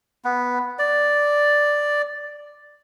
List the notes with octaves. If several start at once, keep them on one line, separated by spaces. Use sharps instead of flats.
B3
D5